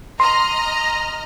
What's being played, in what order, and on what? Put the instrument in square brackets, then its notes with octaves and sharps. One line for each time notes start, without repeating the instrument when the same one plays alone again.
[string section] D#5 A#5 F6 [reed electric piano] C6